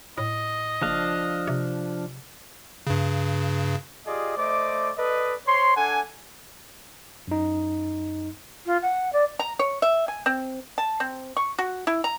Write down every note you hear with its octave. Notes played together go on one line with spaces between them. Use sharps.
A2 D#5
F#1 F3 D4 F5
C3
G2 C#3
F4 G4 G#4 D5 D#5
A3 C5 D5 D#5 D6
A4 B4 D5 D#5
C5 C#5 C6
D4 A4 F#5 G#5
F#2 D#4
F4
F#5
D5
A#5
C#5
E5
G#5
C4
A5
C4
C#6
F#4
E4
A#5